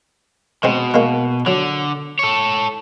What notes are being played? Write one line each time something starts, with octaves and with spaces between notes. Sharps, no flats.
B2 G#3 C4
G#3 A#3
D3 F#3
A4 C#5